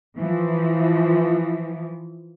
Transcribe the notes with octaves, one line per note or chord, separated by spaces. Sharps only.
E3 F3